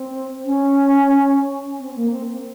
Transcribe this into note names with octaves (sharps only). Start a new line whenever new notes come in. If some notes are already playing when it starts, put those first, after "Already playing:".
Already playing: C4
C#4
C4
A#3
C4
C4